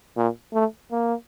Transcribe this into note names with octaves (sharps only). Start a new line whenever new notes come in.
A#2
A3
A#3